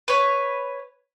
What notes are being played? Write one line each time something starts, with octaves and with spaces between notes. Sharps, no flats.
B4 C#5